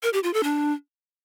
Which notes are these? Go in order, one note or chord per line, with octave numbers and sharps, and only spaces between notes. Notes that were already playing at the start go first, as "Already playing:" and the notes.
A#4
G4
F4
A4
D4